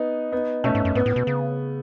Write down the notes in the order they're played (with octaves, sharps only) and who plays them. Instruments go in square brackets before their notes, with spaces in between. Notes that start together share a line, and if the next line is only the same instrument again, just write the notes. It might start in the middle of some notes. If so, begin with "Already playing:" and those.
Already playing: [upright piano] B3 D#4
B3 D#4
[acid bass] B2 [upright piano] A3 C#4
[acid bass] G#2
F#2
[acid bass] G#2 [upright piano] B3
[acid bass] A2
B2
C#3